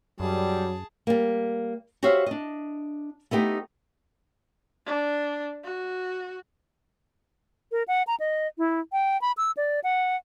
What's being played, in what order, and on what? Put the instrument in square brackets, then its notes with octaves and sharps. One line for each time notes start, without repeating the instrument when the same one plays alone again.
[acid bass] F#2 [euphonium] F#3 [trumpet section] G3 [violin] G#4 A5
[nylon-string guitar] G3 A#3
F#4 G4 C5 C#5 E5 F5
D4 D#5
A3 B3 D#4 G4
[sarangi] D4
F#4
[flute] A#4
F#5
A#5
D#5
E4
G5
B5
E6
D5
F#5